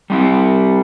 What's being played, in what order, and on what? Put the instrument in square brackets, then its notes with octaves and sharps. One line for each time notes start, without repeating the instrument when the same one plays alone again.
[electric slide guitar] G3 C4 G4